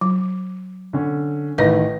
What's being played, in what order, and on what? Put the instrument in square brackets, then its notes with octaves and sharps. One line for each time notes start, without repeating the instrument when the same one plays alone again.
[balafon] F#3
[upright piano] D3 C#4
[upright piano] A1 D#3 A#6 [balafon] B4 D#5